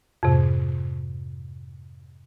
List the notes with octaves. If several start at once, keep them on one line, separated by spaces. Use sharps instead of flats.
F2 G#2 C3